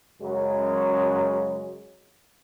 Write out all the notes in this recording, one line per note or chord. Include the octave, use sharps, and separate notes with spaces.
F#2 C#3 F#3 G#3